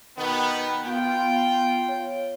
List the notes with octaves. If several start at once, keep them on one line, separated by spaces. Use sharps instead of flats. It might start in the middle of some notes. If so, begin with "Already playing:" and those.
B2 D#3 B3 G5 B5
B3 F4 G5
C#5